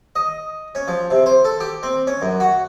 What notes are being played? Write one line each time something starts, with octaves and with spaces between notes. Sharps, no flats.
D#5
C#4
F3
C3
C5
A4
G4
C4
C#4
F#2
F#4